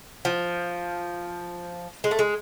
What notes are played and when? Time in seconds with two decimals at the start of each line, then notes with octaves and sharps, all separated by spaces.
0.25 F3
2.04 G#3
2.11 A3
2.19 G#3